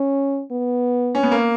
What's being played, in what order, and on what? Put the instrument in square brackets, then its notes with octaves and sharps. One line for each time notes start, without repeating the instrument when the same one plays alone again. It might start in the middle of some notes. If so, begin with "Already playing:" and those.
Already playing: [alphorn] C#4
B3
[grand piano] C#4
B3
A#3